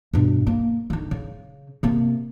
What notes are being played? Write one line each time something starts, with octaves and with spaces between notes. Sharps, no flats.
G2 B2
A#3
D3 D#3
C#3
C3 A#3